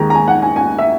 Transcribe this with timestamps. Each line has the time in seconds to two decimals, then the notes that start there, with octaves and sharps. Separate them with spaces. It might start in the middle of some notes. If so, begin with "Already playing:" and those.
Already playing: D#2 D#3 G#3 A#5
0.10 A#5
0.15 G#5
0.28 F#5
0.42 G#5
0.56 G#5
0.79 E5